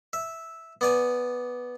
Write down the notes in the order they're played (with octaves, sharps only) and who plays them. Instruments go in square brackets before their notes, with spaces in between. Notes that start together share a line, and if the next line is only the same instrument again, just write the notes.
[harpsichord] E5
B3 D5 G#5